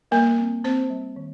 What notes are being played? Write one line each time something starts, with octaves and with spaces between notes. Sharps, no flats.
G3 A#3 A#4
C4
C4 C5
G3
D#3